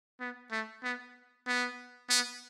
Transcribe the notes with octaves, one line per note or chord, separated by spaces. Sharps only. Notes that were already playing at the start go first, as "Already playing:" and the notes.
B3
A3
B3
B3
B3